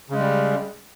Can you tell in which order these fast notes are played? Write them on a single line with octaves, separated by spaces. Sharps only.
C#3 G#3 G3